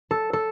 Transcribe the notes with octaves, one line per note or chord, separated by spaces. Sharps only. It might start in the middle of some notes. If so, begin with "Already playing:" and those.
A4
A4